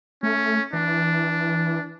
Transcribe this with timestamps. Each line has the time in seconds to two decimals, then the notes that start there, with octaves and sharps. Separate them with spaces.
0.23 A3 C#4
0.73 E3 D4